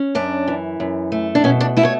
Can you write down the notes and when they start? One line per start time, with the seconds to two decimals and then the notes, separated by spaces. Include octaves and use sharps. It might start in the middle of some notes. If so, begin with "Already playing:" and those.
Already playing: C#4
0.15 F#2 D4
0.48 E3
0.80 F#2
1.12 A3
1.35 D4
1.44 B2 C#4
1.61 D4
1.77 A3 E4
1.85 C#5